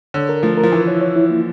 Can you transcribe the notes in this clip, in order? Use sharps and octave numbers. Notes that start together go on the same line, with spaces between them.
D3 C#5
A#4
F3 A3
A#4
F3
E3 E4
C#5
C#5
E4
A#3